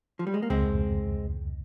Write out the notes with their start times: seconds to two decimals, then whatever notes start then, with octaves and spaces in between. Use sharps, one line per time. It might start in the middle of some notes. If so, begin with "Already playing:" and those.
0.19 F3
0.27 G3
0.34 G#3
0.42 A#3
0.50 C#2 G#3 C4